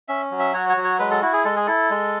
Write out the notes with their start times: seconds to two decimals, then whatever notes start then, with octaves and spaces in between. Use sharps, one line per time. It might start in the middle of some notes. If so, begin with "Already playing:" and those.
0.08 C#4 E5
0.31 F#3
0.39 E5
0.53 F#4 C#5
0.69 C#5
0.77 F#3
0.84 C#5
0.99 G#3 B4
1.11 A4
1.22 E4 F#4
1.33 G#4
1.44 G#3 A4
1.56 G#4
1.67 E4 A4
1.90 G#3